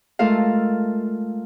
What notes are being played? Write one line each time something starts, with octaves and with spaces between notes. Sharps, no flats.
G#3 A3 F4 A4 A#4 F5